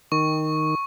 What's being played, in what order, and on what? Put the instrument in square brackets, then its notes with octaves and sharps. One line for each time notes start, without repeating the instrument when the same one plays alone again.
[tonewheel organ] D#3 [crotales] C#6